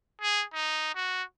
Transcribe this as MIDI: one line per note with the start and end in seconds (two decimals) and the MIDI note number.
0.22 0.44 68
0.54 0.94 63
0.95 1.23 66